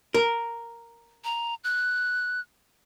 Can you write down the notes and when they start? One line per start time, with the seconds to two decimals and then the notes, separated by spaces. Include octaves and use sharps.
0.14 A#4
1.24 A#5
1.64 F#6